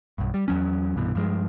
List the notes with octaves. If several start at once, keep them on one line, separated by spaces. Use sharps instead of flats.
B1 G2
G3
E2 F#3 C#4
C2 G2 B2 E3
G2 F3 G#3